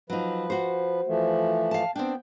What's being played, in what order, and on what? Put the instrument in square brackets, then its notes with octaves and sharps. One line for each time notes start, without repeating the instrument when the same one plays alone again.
[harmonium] F3 B4 [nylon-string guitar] F#3 D#4
[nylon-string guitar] F#4 C5
[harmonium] E3 F3 A3
[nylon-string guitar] F5 A5
[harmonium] B3 G5 [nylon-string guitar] C4 D4